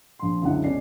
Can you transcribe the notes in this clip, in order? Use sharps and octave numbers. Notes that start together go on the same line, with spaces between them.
A#1 C6
F#1 C#2 F#2 D3 E4 F#5
C#2 B2 C#4 A4 D5 C7